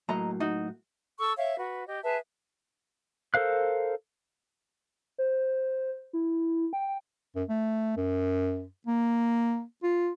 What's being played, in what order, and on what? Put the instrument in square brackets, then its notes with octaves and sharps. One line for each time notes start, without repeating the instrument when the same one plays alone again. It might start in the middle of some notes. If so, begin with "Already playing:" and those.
[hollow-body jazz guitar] A2 F#3 A#3 [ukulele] D#5 A#5
[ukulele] D#4 F#4
[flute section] A4 C#6 E6
C#5 E5 F5
F#4 B4
G4 D#5
G#4 B4 E5 A5
[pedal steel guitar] A4 A#4 C5 F5 F#6
[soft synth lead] C5
E4
G5
[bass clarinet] F#2
A3
F#2
A#3
F4